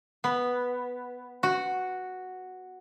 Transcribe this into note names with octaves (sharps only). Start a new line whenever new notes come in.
B3
F#4